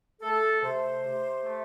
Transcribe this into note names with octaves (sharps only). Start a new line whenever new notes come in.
A3 A4
C3 C5
C3
A3